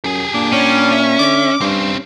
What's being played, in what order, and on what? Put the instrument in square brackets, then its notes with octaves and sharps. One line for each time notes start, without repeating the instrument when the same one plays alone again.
[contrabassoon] F#2 [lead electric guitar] G4 G#4
[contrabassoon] A#2 [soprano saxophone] D4
[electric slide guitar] C#4 [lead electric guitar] D5 G5
[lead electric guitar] E5
[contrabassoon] D3 [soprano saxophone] D6
[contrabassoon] G2 [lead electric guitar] C4 C#4